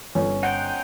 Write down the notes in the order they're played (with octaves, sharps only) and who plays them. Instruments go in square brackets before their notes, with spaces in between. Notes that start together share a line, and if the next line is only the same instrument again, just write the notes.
[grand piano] G1 [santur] C#4
[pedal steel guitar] D#4 C5 G5 [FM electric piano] F#5